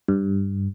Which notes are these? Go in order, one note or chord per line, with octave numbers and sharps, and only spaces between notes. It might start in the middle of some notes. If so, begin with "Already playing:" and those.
G2